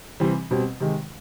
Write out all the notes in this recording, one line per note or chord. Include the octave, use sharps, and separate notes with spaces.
C3 E3 G3 C4
B2 G3 C4
C3 D#3 G#3